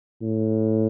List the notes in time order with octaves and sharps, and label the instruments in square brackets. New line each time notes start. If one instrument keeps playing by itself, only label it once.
[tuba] A2